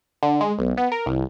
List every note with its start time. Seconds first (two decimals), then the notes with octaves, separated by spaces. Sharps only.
0.23 D3
0.41 G#3
0.59 B1
0.77 B3
0.92 A#4
1.06 C2